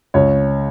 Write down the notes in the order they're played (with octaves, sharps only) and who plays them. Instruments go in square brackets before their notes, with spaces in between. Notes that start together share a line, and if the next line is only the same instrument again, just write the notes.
[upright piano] C#2 C#5